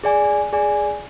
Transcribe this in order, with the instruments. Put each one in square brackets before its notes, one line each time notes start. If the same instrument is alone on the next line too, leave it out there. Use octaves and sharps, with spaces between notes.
[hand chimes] G#4 D5 G#5
G#4 D5 G#5